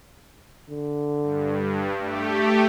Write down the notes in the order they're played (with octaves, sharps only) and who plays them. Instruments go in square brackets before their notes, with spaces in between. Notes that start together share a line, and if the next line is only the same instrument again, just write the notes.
[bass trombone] D3
[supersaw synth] G2
A3 G4